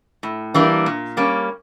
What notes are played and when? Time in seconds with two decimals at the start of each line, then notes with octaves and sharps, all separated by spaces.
0.23 A2
0.54 E3 G3 A#3 D4
0.86 A#2
1.17 G3 A#3 C#4